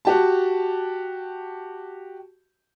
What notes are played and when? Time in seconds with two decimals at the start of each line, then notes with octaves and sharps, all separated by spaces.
0.05 F#4 G4 A5